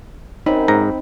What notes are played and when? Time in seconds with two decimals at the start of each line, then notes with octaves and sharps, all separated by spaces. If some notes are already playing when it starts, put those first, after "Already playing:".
0.46 F#2 C4 D#4 B5
0.68 G#2 A#5